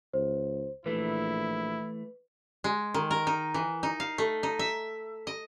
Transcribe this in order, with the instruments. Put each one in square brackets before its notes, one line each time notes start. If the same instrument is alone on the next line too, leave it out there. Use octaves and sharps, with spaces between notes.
[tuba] C#2 [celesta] C5
[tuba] A#1 [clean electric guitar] E3 A3 [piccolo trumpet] E4 [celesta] B4
[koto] G#3
D#3
A#4
D#4
E3
D#4
F5
A3
D#4
E5
D#5